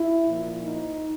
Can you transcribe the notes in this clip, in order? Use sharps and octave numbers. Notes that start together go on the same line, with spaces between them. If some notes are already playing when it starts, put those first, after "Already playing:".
Already playing: E4
A#2 F3
D#4